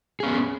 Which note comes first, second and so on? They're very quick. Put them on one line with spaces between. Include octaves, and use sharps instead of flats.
G#4 C#4 B3